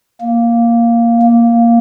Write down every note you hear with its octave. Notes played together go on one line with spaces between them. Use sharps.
A#3
A#3